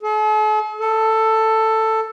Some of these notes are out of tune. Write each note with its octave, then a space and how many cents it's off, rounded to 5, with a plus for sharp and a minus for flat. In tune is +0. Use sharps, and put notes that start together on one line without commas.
A4 -45
A4 +10